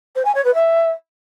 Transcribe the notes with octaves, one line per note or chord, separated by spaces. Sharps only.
C5
G#5
C#5
B4
E5